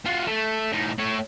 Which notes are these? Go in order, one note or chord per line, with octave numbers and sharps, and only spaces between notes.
F4 F#4
A3
A2 D#4
A3 C#5